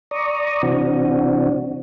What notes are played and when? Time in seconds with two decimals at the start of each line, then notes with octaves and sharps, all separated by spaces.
0.11 D5 A#5 C#6 D#6
0.63 C3 E3 C4 D4 F#4